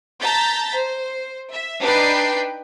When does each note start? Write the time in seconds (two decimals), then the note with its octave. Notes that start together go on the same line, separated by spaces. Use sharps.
0.20 A5 A#5 G6 A6 B6
0.74 C5
1.51 E5
1.81 D4 D#4 B4 G5 C7